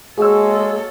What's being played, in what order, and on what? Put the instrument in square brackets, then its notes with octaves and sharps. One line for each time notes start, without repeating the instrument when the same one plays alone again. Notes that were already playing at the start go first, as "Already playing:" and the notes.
[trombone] G#3 [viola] A#3 A4 [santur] F#4 C#5 [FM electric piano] G#4 E6